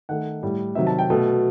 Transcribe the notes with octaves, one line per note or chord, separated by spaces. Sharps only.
D#3 A3 F#5
A2 G3
C3 D#3 F#3 E5
A5
G5
B2 A3